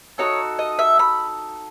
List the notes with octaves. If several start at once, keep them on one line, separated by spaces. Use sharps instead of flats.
D#4 F#4 A4 C#5
D#5
E5
B5